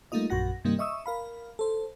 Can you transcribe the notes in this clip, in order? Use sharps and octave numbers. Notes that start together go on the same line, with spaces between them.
G3 A3 A#3 D#4 F4 D#5
A#1 F#2 F#4 F#5 A#6
G2 C3 D#3 G3 A#3 D#4
D#5 E5 C#6 D#6 E6
A#4 F5 B5
A4 C5